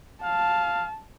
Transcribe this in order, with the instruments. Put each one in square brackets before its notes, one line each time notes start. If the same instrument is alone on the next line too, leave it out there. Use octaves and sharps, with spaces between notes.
[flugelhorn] F5 [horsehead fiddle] A5